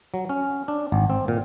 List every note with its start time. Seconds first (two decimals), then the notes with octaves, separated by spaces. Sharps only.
0.14 F#3
0.29 C#4
0.68 D4
0.92 G#1
1.10 C4
1.28 A#2